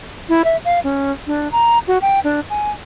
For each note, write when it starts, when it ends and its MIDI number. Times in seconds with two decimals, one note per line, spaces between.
0.29 0.42 64
0.44 0.57 76
0.65 0.79 77
0.84 1.12 61
1.27 1.51 62
1.52 1.78 82
1.88 1.98 66
2.02 2.19 79
2.24 2.40 62
2.50 2.71 80